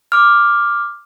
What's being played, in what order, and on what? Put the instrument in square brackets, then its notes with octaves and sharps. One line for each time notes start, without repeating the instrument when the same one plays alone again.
[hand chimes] D6 F6